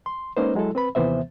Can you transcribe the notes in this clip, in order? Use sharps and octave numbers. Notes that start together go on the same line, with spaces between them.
C6
G#3 A#3 C#4 D#4 B4 C5
F#3 G#3 E4 A4
C4 B4 B5
D#2 C3 E3 B3 C5 E5